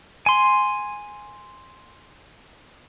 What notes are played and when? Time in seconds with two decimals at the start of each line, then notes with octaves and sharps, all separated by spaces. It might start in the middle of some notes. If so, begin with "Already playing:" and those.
0.26 G#5 C6